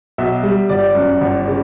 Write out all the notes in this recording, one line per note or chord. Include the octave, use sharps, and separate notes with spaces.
B1 E5
G3
G1 D5
F#2
G1
C#3